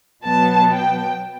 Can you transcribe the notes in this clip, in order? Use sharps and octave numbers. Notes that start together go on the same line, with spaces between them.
B2 F#3 B3 A5
G5